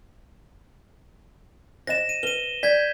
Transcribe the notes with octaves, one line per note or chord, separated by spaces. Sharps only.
C5 D#5 A#6 E7
D#7
B4 D#7 G7
D5 G6 G#6 B6